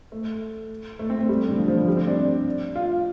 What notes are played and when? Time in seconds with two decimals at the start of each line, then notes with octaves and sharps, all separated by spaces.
0.12 A3
0.99 A3
1.10 C4
1.19 A3
1.29 G3
1.49 D3
1.58 F3
1.68 F3
1.78 G3
1.88 G3
1.97 C4
2.07 D4
2.75 F4